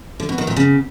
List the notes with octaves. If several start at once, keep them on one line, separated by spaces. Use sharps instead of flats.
D3
B2
D#3
A#2
C#3